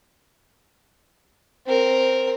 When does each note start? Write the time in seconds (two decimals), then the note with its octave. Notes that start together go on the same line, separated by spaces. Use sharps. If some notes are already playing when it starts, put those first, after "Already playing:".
1.67 C4 A#4